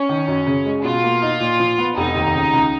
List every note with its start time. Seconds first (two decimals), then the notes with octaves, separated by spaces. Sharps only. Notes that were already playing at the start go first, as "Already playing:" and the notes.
Already playing: C#4
0.09 D#3
0.28 F#2
0.46 C#3
0.65 G#3
0.84 B2 F4
1.03 A#3
1.22 D#4
1.40 A#2
1.59 F3
1.78 B3
1.97 F1 D#4
2.15 D#2
2.35 C#3
2.53 C#2